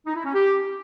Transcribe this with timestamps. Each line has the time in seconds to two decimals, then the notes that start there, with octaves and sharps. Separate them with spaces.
0.06 D#4
0.16 E4
0.25 C#4
0.34 G4